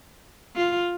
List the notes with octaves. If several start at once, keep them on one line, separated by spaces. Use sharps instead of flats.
F4